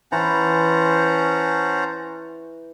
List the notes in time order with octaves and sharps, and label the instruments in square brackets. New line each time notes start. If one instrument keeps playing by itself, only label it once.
[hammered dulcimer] E3 [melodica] C#4 C5 [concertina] F#5 A5 A#5